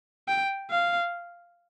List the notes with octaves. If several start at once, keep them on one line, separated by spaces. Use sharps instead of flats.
G5
F5